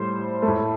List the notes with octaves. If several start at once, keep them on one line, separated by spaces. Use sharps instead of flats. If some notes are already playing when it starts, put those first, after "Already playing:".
Already playing: A2 G3 C5
A3
A2